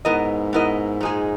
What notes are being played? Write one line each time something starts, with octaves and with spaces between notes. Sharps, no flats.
G#2 B3 E4 A#4 D#5
B3 E4 A#4 D#5
A#2 G#3 D#4 G#4